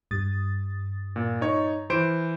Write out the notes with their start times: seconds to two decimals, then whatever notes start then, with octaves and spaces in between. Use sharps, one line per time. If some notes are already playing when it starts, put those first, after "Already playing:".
0.11 G2 D#6 A6
1.16 A#2
1.41 D#4 C#5
1.90 E3 C5 D7